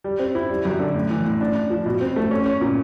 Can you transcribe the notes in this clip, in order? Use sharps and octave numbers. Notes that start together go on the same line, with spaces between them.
G3
C4
E4
G3
F#2
D3
A2
E3
A2
D4
D4
F3
B2
C4
A3
C#4
C#4
A#2